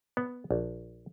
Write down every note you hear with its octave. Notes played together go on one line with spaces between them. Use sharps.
B3
A#1